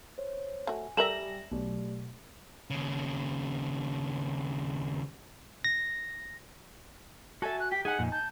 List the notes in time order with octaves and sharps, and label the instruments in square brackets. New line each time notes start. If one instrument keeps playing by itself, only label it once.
[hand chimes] C5 C#5
[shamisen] A3 F#4 [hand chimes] G#5
[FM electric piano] G3 A#6 [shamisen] A4 A#4 E5 [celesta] E7 F#7
[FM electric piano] B1 [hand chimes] A3 G4 D5
[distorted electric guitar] D#2 C#3
[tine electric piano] A#6
[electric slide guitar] F#4 G#5 [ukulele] A4 E5 [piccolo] A5
[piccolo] F#6
[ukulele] G4 [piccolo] B6
[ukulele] D#4 G#5 [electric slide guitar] G#4 [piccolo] F#5
[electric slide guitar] F2 A#2
[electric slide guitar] A5 [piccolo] G6